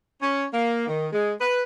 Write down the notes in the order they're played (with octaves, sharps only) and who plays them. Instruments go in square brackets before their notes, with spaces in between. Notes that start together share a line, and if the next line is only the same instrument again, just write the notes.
[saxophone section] C#4
A#3
D#3
G#3
B4